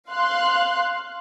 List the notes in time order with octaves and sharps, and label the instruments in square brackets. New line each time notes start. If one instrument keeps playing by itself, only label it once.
[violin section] F5 C6 F#6